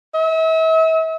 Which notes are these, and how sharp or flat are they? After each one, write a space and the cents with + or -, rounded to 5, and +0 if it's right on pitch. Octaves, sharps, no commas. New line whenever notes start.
E5 -40